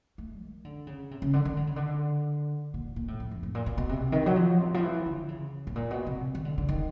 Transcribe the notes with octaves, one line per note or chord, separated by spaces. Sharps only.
A3
D#3
D3
C#3
C3
C#3
D3
D#3
D3
C#3
D3
A#2
A#2
A2
F2
F2
A2
A#2
B2
B2
C3
D#3
F#3
F3
C3
F3
E3
D3
C#3
A2
A#2
B2
C3
D#3
D3
D3
D#3